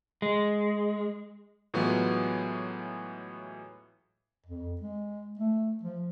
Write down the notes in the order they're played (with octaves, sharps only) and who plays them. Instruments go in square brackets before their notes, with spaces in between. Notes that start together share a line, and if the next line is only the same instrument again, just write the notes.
[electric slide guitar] G#3
[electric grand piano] A2 E3 F#3 G#3 B3 F4
[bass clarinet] F2
G#3
A3
F3